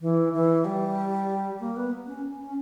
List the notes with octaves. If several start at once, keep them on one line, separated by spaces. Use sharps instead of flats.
E3
E3
G3
A#3
B3
C#4
C#4